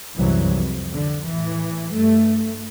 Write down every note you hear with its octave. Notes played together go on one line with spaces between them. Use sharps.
C2 F#2 E3 F#3
F2
D3
A2 E3
G2 A3